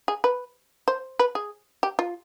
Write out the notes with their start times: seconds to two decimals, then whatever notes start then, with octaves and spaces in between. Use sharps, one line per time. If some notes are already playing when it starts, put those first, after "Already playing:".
0.08 G#4
0.24 B4
0.88 C5
1.19 B4
1.35 G#4
1.83 G4
1.99 F4